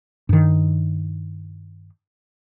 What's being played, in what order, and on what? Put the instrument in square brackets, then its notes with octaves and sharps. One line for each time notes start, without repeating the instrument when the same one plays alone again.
[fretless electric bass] G2 D#3